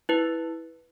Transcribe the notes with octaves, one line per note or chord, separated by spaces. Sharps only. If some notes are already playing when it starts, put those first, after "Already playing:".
E4 B4